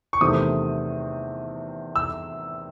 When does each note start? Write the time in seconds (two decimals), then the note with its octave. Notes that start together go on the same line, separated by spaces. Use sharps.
0.13 C#6
0.21 E2 C3 D#3 A3 C4 D#6
1.96 E6